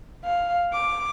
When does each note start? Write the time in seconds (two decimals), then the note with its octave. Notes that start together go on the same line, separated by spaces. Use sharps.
0.24 F5
0.73 D6